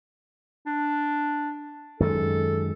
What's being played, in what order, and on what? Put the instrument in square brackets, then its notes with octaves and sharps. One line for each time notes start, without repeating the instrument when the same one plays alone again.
[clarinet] D4
[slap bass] F#2 D#3 G#3 [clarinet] A4